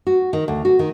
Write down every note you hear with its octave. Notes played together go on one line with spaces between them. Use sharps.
F#4
D#3
D2
F#4
D#3